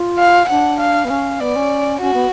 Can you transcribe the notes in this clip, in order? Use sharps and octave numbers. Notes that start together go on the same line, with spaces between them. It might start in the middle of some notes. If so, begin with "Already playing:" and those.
Already playing: F4
F5
D4 F#5
F5
B3
C#4 F5
B3 D5
C#4
C#4 F#4
B3